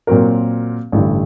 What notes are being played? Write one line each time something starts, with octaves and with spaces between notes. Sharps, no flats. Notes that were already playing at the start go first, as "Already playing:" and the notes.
A#2 F#3 C4 F#4 A#4
A1 G2 D3